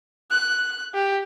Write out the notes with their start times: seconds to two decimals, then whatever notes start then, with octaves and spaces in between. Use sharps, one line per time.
0.30 F#6
0.94 G4